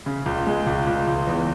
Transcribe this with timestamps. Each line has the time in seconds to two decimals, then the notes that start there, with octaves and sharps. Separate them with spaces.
0.06 C#3
0.26 C#2
0.47 G#3
0.67 C#2
0.87 C#2
1.07 C#2
1.27 E2